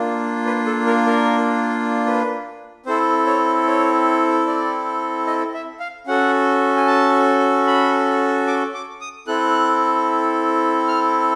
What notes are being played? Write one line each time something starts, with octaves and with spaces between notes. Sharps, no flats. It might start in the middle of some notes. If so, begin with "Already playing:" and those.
Already playing: A#3 D4 F4
B4
A4
A#4
A#4
B4
C4 E4 A4 C5
C#5
C#5
D5
D#5
E5
F5
C#4 F#4 A4 F#5
G#5
A5
B5
D6
D6
D#6
C4 E4 A4 F#6
F6